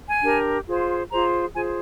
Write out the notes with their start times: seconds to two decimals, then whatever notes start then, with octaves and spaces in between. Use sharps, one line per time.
0.09 G#5
0.23 D4 G4 A#4
0.67 F4 G#4 C5
1.11 F4 G#4 C5 A#5
1.55 F4 G#4 C5 G#5